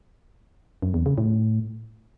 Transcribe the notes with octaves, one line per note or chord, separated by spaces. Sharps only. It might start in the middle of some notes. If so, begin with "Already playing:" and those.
F#2
E2
C#3
A2